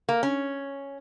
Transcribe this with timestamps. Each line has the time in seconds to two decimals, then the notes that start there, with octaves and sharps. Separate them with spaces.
0.09 A#3
0.23 C#4